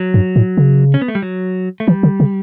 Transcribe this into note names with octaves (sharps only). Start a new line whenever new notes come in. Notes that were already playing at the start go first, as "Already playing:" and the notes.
Already playing: F#3
G2
A2
C#3
C#4
B3
A3
G3
F#3
A3
E3 G3
D3
C#3